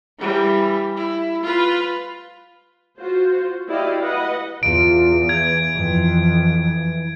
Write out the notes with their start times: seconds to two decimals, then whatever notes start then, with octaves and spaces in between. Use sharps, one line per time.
0.19 E3 G3
0.97 E4
1.43 F4 B4
2.99 F4 F#4 C5
3.68 E4 F#4 G4 D5 D#5 F5
4.01 B4 D#5 F#5
4.63 E2 F4 D7
5.29 E3 G#6
5.75 F2